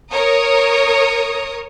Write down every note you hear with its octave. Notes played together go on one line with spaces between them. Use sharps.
A#4 C#5 A#5 D#6